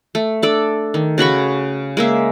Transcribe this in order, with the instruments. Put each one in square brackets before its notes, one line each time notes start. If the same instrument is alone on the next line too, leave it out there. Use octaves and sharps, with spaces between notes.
[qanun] A3
D4 A4 D5
D#3
C#3 F#4 B5 C#6
G#3 A#3 E5